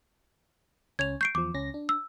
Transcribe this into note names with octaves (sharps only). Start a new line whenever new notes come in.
C#2 C#4 C#5 G#6 F7
C#6 G6 C7 D7
E2 F3 D6
C#2 C#4 A#6
D4
E6